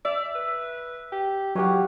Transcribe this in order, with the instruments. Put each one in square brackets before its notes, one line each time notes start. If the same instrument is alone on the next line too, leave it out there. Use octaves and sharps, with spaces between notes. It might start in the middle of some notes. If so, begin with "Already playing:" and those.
[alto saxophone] D5 [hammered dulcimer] E5
[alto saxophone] B4
G4
[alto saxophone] E3 [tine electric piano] F#3 G4 [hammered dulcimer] C#5 F5 F#5